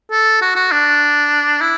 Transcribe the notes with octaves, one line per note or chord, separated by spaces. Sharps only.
A4
F#4
F#4
D4
E4